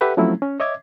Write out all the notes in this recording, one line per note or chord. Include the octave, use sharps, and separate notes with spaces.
G4 A4 B4 E5 F#5
F3 F#3 A3 C4 C#4 E4
C#4
C#5 D#5 E5 D6 G#6